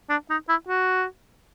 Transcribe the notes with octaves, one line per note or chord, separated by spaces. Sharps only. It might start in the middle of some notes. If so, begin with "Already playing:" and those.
D4
D#4
E4
F#4